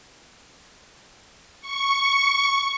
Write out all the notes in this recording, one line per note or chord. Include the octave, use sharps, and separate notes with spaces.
C#6